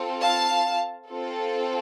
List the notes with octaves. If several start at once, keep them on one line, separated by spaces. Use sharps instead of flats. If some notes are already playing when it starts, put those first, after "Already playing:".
Already playing: C4 F4 A4
F5 A5
C4 F4 A4